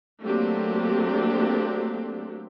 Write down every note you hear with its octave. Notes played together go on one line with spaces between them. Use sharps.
F#3 A3 A#3 C4 D4 G4